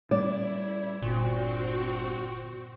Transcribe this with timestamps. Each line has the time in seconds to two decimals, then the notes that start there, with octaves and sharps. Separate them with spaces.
0.11 G3 C#4 E4 D5
1.02 G1 A#2 C4 F#4